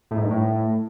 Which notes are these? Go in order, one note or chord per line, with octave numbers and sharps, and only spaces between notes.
A2
G#2
G2
A2